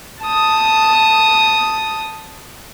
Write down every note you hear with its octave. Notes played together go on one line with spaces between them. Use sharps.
A5 D#6